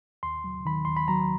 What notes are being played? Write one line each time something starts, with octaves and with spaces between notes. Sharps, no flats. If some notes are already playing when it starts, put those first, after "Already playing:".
D#2 C6
F#3
D#3 B5
D#2 C6
B5
F#3 A#5